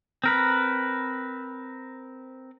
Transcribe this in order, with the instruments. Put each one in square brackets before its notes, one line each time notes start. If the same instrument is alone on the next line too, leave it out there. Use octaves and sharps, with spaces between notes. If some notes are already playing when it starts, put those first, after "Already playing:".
[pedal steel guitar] C4 A#4 B4